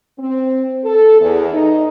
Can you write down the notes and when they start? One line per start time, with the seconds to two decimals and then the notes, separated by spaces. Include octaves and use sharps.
0.19 C4
0.84 A4
1.21 E2
1.52 D#4